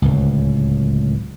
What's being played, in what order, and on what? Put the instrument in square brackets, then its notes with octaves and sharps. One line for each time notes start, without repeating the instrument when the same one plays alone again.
[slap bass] D1 C#2